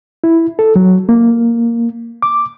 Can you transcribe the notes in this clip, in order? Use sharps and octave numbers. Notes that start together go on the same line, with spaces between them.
E4
A4
F#3
A#3
D6